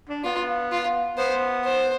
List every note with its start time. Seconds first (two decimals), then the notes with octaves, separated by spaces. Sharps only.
0.09 D4
0.24 B3 F4
0.72 F4
1.17 B3 C5
1.64 C5